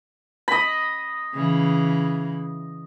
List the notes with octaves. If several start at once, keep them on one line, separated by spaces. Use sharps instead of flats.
D#5 B5
C#3 E3